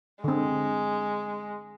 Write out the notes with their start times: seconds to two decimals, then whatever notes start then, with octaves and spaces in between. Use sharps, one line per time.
0.24 D3 G#3 C4